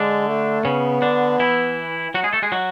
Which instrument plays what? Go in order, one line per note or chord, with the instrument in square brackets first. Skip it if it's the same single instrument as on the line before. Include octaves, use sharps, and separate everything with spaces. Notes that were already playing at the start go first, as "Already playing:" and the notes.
Already playing: [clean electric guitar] D3 D4 [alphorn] G#3
[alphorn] A3
[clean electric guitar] C#3 C#4 [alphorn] B3
[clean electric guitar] D3 D4
E3 E4
F#3 F#4
G#3 G#4
A3 A4
G#3 G#4
F#3 F#4